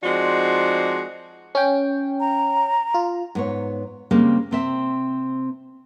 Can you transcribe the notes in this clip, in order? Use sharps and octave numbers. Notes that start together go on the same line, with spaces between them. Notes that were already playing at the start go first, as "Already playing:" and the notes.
F3 G#3 C4 D#4 F#4 D5
C#4 G5
A#5
F4
G#2 B3 C#5
C#3 G3 G#3 A#3 C4
C3 C4 E5